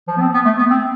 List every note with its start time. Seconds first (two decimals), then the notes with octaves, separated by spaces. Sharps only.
0.08 F3
0.17 B3
0.21 C4
0.34 B3
0.45 A3
0.58 B3
0.70 C4